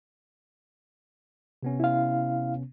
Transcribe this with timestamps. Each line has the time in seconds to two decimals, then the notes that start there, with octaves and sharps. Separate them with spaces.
1.63 C3 B3 C#4
1.80 E4 F5